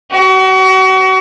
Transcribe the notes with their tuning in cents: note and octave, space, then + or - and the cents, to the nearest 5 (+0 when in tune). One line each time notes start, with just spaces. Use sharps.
F#4 +35